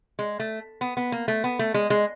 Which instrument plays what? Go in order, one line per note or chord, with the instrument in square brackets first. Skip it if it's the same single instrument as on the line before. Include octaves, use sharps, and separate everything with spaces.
[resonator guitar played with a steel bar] G#3
A3
B3
B3
A#3
A3
B3
A3
G#3
G#3